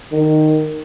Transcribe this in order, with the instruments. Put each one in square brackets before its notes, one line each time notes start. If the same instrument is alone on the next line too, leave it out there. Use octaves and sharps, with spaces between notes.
[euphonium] D#3